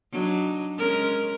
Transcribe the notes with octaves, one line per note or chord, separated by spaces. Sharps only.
F#3 D4 D#4
G#3 C#4 A#4